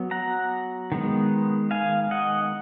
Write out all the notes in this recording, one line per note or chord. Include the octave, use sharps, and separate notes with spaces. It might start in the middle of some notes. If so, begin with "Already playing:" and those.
Already playing: F#3 B3
F#5 A#5
D#3 G#3 B3
F5 G#5
D#5 F#5